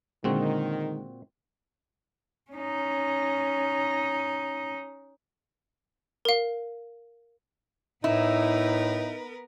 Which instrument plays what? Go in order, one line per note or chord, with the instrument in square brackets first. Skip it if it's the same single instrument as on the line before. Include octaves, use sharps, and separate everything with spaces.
[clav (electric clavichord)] A#2 C4 F#4 [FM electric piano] D3 G#3 [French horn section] D#3
[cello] C#4 D#4
[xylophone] A#4 F5
[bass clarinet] A2 [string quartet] B3 A#4 B4 [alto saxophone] D#4 [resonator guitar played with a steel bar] E4